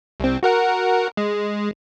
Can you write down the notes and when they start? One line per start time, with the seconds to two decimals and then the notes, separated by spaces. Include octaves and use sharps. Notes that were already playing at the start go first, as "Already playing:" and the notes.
0.20 C2 C4
0.43 F#4 A#4 F#5
1.17 G#3